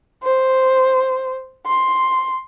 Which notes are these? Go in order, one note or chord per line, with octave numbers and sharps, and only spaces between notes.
C5
C6